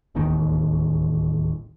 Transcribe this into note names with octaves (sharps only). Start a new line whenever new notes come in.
D1 A1 D#2 D#3